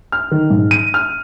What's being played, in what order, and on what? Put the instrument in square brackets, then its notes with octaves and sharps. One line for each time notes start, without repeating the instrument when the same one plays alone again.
[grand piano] F6
D#3
G#2
D#7
F6